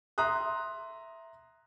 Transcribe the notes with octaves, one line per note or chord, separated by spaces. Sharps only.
E5 A#5 C6 D#6 F#6